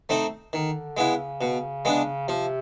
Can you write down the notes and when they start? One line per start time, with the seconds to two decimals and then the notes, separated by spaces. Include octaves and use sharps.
0.09 A3 C4 D#4
0.53 D3 D#3
0.97 C#3 G#3 B3 E4
1.41 B2
1.85 G#3 B3 D4
2.28 C3 F3